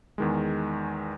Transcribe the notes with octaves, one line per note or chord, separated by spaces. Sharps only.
E2 D#3 G#3